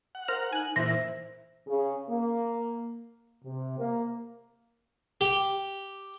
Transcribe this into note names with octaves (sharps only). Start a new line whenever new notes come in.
F#5
A#4 C5 F5 A#5
D#4 G#5 F#6
A#2 E3 E4 C5 E5 A#6
C#3
A#3
C3
A#3
G4